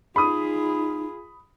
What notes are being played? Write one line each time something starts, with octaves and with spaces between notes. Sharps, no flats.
D#4 F4 G#4 B5 D#6